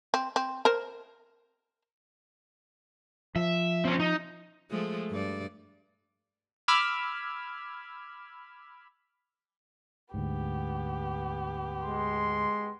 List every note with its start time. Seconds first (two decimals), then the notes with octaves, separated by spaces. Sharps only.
0.14 C4
0.36 C4
0.65 A#4 C5
3.36 F3 E5
3.85 C4 C#4
4.00 D#4
4.71 F3 G#3 A3
5.11 G2 D5
6.68 B5 D6 E6 F6 G#6
10.14 D2 G#2 B3 G4
11.82 G#3 C6